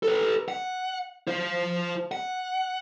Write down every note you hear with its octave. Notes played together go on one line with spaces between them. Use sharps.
A4 B4
F#5
F4 C5
F#5